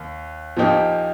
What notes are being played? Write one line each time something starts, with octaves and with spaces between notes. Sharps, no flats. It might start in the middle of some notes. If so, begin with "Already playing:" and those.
Already playing: D#2
A#2 F3 A#3 D#4 G4